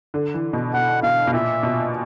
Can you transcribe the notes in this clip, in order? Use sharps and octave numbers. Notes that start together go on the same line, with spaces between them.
D3
E3
B2
B2 F#5
B2 F5
B2
A#2 E5
B2